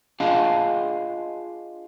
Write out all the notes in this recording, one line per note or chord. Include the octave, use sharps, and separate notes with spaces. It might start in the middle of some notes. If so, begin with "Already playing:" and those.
D4 F4 G#4 D#5 F5 A5